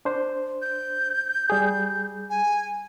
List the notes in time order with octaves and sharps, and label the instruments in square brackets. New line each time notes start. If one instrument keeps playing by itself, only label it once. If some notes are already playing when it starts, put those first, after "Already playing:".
[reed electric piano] D4 C5
[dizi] G6
[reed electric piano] G3 G#4
[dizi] G#5